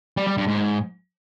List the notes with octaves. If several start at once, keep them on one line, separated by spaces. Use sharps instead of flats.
G3
G3
G2
G#2